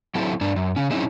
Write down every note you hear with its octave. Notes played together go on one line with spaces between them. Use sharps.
F#3 C4 E4 G4 A4
G2 D4 A#4
F#2
C#3 C#4
F#3 C4 C#4 D#4 E4 G#4